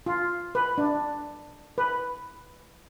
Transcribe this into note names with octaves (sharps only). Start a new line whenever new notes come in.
F4
B4
D4
B4